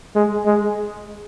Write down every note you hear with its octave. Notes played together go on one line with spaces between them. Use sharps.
G#3
G#3